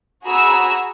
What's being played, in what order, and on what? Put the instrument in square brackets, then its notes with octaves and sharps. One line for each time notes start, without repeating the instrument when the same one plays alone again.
[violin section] F#4 G#4 A#5 B5 D#6 E6